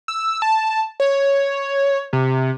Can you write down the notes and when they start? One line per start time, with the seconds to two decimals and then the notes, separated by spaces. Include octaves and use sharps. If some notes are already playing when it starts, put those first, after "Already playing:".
0.08 E6
0.42 A5
1.00 C#5
2.13 C3